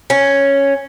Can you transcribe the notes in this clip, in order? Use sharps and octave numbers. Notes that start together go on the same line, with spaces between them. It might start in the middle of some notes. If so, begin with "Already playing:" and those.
C#4